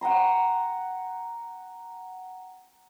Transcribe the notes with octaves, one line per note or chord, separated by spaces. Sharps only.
F#5 G5 A#5 C6